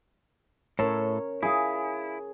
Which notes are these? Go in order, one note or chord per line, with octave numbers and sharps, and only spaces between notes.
A2 C#4 A4 A#4 C#5
E4 G#4 F5 G#5